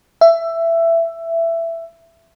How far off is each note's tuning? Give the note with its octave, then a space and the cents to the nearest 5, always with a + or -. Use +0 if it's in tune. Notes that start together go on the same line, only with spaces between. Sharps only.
E5 +15